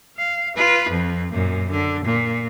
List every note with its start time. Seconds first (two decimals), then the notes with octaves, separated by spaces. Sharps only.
0.17 F5
0.57 F4 B4
0.89 F2
1.31 F#2 A#2
1.70 D3
2.05 A#2